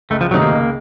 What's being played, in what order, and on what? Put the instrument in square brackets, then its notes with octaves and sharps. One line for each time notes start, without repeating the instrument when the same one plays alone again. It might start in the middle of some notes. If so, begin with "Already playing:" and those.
[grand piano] C#2 [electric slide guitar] A3
[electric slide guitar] F3
[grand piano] C3 D#3 A3 D#4 [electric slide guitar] F#3
[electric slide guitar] A#3
[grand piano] C#2